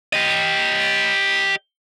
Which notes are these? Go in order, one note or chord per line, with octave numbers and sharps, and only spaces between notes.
G4 D#5